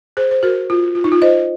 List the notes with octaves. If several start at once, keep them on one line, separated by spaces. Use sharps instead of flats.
G#4 C5
C5
F#4 A#4
F4
F4
D#4
F4
C5 D#5